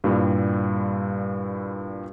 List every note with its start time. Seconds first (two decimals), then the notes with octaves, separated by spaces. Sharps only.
0.04 G2 A#2 G3 E4